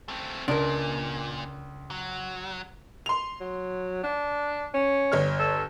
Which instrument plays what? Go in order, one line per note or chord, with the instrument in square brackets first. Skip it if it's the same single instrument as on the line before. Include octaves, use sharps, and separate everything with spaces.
[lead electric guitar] A3 C4
[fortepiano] C#2 [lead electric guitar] A#2 [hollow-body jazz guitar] D4 A#4
[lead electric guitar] F#3
[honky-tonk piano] C6 F7
[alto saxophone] F#3
D4
C#4
[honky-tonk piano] G1 C#5 F6
[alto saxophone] A4